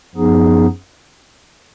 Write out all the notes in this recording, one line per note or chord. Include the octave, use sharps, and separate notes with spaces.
F#2 F3 B3 D#4 G#4